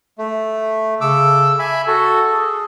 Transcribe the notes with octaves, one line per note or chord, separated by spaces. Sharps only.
A3
C#3 A4 D6 E6
E5 G#5 B5
F#4 A4
G#4